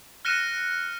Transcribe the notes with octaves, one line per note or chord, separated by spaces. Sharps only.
F6 F#6 A#6 C#7 D#7 E7